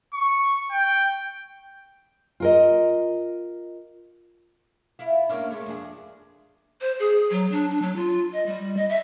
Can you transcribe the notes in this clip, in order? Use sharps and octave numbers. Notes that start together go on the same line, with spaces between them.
C#6
G5
F4 A#4 D#5
E4 F4
A#3 C#4 D4
G#3 A3
F2 D4 G#4
C5
G#4
F#3
D4
D4
F#3
F4
D#5
G3
D#5
E5